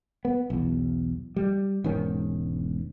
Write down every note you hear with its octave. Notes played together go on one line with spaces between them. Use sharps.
B3
B1 E2
G3
E1 G#2 D#3 C#4